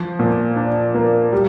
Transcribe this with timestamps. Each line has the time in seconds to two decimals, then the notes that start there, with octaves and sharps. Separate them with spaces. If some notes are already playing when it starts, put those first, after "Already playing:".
Already playing: F3
0.19 A#2
0.56 D4
0.94 A#3
1.33 G3